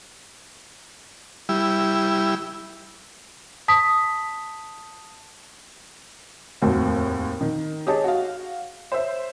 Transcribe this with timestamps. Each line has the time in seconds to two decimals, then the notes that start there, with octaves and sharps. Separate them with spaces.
1.49 G3 E4
3.68 A5 D#6 B6
6.62 F1 D#2 A2 C4 F#4
7.41 D#3
7.87 G4 G#4 C#5 D#5 A5
8.04 F#4 F5
8.92 C5 C#5 E5